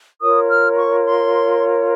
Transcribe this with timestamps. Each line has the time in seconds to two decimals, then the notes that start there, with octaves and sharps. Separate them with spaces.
0.21 F4 A#4 C#5 D#6
0.49 F6
0.77 C#6
1.05 C6